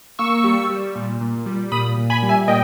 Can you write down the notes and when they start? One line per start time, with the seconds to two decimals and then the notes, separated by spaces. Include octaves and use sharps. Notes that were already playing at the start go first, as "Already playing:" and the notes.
0.19 A#3 C#6 E6
0.44 G3
0.70 G3
0.95 A#2
1.21 A#2
1.46 G3
1.72 A#2 B5 D#6
1.98 A#2
2.10 G#5 B5
2.23 G3
2.29 E5 G#5
2.48 A#2 D#5 G5